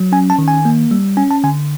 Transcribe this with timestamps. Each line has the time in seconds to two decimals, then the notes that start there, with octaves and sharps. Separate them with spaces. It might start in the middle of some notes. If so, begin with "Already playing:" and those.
Already playing: F#3
0.12 C#4 G#5
0.30 A5
0.39 D#3
0.48 G#5
0.65 A#3
0.91 G3
1.17 C#4 G#5
1.31 A5
1.44 D3 G#5